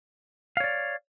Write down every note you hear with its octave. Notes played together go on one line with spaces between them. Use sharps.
C#5 D5 F5